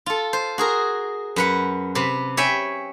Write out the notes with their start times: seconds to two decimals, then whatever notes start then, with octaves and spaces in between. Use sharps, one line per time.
0.06 F4 A4
0.33 C5
0.58 F#4 G#4 A#4
1.36 F#2 B4 F#5
1.95 C3 B4
2.37 C#5 E5 G5 G#5 B5